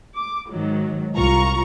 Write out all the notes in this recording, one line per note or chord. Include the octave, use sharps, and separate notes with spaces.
D6
G#2 D#3 F#3
C2 F4 A#5 C#6